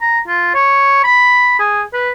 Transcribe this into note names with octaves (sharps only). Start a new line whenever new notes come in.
A#5
F4
C#5
B5
G#4
B4